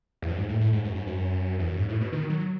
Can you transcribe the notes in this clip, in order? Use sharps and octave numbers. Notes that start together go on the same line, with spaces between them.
E2
F#2
G#2
A2
A2
G#2
F#2
G#2
F#2
E2
F#2
G#2
A2
B2
D#3
F#3